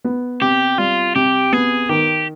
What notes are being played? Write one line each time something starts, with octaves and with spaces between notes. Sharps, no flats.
B3
C3 G4
G3 F4
C3 G4
B3 G#4
D#3 G4